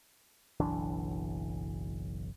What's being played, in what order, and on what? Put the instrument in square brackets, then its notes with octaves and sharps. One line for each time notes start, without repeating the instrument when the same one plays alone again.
[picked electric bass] F#1 B1 E3 D4